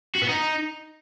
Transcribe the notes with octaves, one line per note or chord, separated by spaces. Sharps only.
F#4
B3
D#4